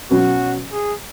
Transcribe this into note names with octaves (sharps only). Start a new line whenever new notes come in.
B2 F#3 C#4 F#4
G#4